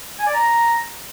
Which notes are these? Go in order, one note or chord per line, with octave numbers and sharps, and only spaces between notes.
G#5
D5
A#5